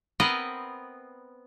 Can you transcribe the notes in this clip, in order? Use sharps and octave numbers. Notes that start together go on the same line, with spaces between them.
B3 C4 A#4 B4 D#5